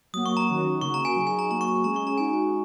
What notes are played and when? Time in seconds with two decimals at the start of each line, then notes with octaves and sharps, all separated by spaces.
0.13 F#3 A#3 F#4 D#6
0.26 C#6
0.37 A#5
0.48 D#3 F#3 C#4 F#4
0.81 C#3 A#3 F#4 C#6
0.94 A#5
1.05 G#5
1.16 F#3 D#4 G#4
1.27 G#5
1.39 A#5
1.50 F#3 A#3 F#4 A#5
1.61 C#6
1.84 G#3 C#4 G#4 A#5
1.96 C#6
2.07 A#5
2.18 G#3 D#4 F#4 G#5